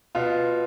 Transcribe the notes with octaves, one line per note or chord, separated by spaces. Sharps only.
B2 F4